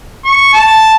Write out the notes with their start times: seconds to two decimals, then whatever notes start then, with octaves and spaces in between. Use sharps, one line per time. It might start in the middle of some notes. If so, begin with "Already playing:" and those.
0.25 C#6
0.53 A5